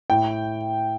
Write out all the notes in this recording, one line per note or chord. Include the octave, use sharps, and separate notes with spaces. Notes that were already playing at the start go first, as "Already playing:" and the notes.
A2 G5